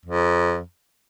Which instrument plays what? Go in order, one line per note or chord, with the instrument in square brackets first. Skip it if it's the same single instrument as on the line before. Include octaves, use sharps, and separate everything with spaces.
[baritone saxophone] F2